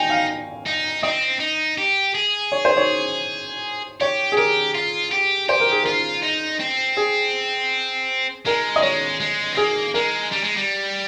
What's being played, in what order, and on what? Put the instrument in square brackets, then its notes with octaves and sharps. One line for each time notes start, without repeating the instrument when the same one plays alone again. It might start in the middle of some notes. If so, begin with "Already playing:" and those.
Already playing: [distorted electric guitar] D#4 [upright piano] G5 G#5
[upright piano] F5
[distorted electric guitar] D#4
[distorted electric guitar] C4 [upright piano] D#5
[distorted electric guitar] D#4
G4
G#4
[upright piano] C#5
C5
C#5
[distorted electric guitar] G4 [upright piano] C#5
[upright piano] G#4
[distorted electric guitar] G4 [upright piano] A#4
[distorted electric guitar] F4
G4
[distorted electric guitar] G4 [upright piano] C5
[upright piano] A#4
G#4
[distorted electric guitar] F4 [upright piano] A#4
[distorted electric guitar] D#4
C4
[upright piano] G#4
[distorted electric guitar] G#3 [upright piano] A#4
[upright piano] D#5
[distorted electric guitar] G#3 [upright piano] C#5
[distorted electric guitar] G#3
C4
[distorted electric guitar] A#3 [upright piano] G#4
[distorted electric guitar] G#3 [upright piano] A#4
[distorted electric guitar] G3
G#3
G3